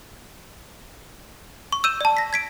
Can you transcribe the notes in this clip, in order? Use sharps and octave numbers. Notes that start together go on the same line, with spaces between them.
C#6
E6 G6 D#7 E7
D5 A5
A#6 B6
G#6 B6 D7